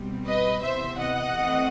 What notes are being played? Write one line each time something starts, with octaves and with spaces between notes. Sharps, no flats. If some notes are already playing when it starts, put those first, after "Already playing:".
Already playing: B2 G3 C4
B4 D#5
C3 E3 B3 C5 E5
D#5 F#5
E3 A3 C4